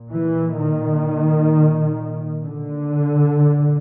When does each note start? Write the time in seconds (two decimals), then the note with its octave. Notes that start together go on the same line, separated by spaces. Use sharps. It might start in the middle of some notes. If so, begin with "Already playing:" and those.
Already playing: A#2
0.13 E3
0.59 D#3
2.43 D3
3.36 A#2